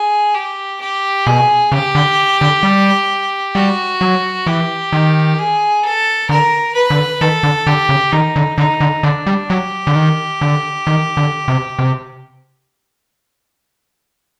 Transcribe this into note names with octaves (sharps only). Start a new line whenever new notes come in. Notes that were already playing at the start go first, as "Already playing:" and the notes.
Already playing: G#4
G4
G4
B2 G#4
C#3 G4
D3
D3
G3
G3 F#4
F#3
E3 G4
D#3
G#4
A4
D3 A#4
B4
D3
D#3 A4
D3
D3 G4
C#3
D#3 D#4
D3
D3 D#4
D3
D3 D4
G3
F#3 G4
D3
D#3
D3
D#3
D3
C3
C3